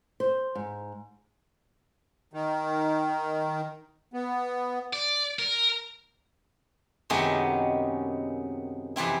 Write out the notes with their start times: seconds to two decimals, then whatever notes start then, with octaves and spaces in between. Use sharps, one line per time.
0.20 C5
0.55 G#2
2.33 D#3
4.13 B3
4.93 D5
5.39 A#4
7.10 F#2 C3 D#3 G#3 B3 C#4
8.96 F2 C3 E3 C4 E4